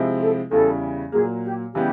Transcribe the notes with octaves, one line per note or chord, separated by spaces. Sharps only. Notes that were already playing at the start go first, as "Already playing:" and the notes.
Already playing: C3 F3 G#3 C4 E4
A4
E2 C#3 E3 G3 A4
A#2 F#3 A#3 G#4
G4
C#3 E3 G3 B3 G4